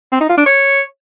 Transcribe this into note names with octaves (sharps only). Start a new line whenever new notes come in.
C4
D#4
F4
D4
C#5